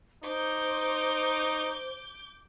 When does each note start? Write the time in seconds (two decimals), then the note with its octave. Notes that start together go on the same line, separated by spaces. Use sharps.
0.23 D#4 C5 D6 G6